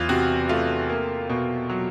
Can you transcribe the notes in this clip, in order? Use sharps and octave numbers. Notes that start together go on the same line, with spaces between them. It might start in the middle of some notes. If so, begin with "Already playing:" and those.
Already playing: E2 E3 F4
C3 F#4
A3 F4
A#3
B2
F#3